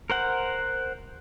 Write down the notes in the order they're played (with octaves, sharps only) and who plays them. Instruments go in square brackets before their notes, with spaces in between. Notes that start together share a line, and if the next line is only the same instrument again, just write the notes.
[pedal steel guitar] A#4 C5 F#5